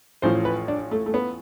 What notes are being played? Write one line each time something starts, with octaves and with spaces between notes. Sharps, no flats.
A1 A2 F3 C5
B4
D4
A3
A3
B3